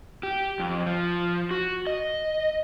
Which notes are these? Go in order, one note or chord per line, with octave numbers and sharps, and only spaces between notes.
G4
F2
F3
F#4
D#5